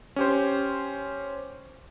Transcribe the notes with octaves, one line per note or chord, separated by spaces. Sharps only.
C#4 G4 C5